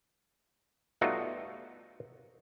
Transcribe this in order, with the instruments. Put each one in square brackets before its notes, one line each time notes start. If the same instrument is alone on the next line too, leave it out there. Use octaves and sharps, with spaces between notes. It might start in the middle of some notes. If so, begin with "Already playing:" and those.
[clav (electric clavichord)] G3 A3 B3 D#4 F4 F#4